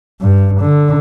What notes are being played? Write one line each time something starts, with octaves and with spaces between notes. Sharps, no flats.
G2
D3